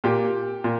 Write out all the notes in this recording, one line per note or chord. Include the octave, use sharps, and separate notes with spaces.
A#2 G4
A#2